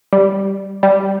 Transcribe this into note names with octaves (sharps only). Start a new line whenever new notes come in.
G3
G3